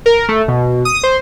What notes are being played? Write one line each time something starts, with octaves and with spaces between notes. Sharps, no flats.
A#4
A3
B2
D#6
C5